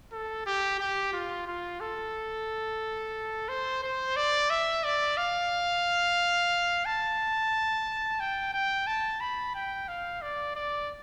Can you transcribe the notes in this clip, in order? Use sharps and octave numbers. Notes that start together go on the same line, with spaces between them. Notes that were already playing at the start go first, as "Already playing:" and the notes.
A4
G4
G4
F4
F4
A4
C5
C5
D5
E5
D5
F5
A5
G5
G5
A5
B5
G5
F5
D5
D5